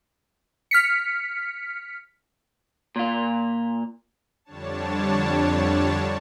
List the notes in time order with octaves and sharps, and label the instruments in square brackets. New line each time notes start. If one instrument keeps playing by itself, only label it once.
[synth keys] F6 B6 C#7
[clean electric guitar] A#2 F4
[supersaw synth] F2 D3 G3 D4 C#5 A5